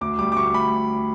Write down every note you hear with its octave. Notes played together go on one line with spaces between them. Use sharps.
D2 D6
G3 D6
D6
D2 C#6
B5